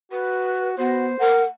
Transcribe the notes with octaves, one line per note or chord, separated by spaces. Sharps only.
F#4 B4
B3 F#4 C5
A#4 F#5